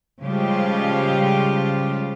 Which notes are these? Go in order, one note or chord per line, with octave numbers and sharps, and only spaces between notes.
C#3 F3 G3 G#3 F4 G4